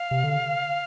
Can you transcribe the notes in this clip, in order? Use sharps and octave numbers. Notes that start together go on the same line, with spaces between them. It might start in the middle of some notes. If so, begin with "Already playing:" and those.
Already playing: F5
C3
D3